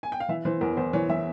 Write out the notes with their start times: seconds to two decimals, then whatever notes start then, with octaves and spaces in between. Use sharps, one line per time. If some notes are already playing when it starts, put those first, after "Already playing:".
0.03 G#5
0.12 G5
0.20 F5
0.29 E3 E5
0.45 E3 C5
0.61 E2 A#4
0.77 E2 C5
0.93 E3 C#5
1.09 E3 E5